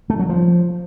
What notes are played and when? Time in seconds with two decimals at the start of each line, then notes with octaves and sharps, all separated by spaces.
0.10 A3
0.19 F#3
0.29 F3